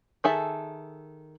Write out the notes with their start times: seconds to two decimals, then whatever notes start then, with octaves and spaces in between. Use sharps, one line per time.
0.24 D#3 G#4 A4 E5 A5